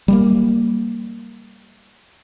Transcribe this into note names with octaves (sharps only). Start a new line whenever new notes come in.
G3 G#3 A#3